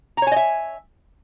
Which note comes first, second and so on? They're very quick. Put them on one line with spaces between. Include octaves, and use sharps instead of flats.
A#5 C#5 G#5 D#5 E5